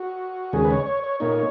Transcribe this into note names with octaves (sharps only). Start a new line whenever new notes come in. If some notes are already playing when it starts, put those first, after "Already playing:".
Already playing: F#4
D#2 C#3 G#3 G#4
B4
C#5
C#5
C#5
A#2 A#3 D#4 C#5